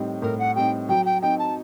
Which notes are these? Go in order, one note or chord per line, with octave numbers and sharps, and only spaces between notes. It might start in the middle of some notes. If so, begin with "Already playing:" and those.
Already playing: A2 G3 C4 D#4
A2 A#4
F#5
G3 C4 D#4 G5
F#3 G5
G5
C4 D#4 G5
A5